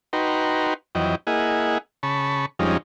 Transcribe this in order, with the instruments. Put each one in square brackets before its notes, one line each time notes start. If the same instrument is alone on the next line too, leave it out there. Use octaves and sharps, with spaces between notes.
[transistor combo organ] D#4 F#4 B4 G5 A#5 C6
F2 E3 F#3 D#5 G5
A#3 E4 G#4 D#5 F#5 G#5
C#3 A5 B5 C#6
F2 F3 G3 G#3 C#4 D#4